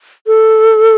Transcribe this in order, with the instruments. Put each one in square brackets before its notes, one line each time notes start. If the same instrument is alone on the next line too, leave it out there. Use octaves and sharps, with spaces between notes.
[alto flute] A4